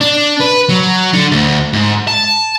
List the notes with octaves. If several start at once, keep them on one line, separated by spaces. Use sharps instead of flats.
D4
B4
F#3
D3
D2
G#2
A5